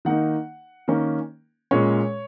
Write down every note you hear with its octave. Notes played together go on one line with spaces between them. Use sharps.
D#3 A#3 D#4 F#5
D#3 A#3 C#4
A#2 G#3 C#4 C#5